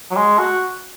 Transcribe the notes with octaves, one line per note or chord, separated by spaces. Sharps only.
F#3
G#3
F#4